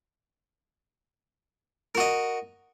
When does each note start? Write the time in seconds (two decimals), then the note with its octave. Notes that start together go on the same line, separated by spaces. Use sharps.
1.95 A#4
1.97 F#4
2.00 D#5